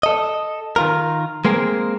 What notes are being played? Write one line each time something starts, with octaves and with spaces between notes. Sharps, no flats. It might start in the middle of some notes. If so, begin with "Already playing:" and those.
A4 D#5
D#3 F4 A#4
G#3 A#3 C4 G#4 A#4